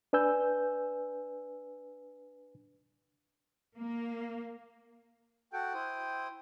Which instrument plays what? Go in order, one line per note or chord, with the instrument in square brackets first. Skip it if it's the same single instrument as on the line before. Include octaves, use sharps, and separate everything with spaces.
[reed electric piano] D4 B4 G#5 E6 G6
[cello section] A#3
[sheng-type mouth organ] F#4 A4 F#5 [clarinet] G5
[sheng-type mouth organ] E4 C5 D#6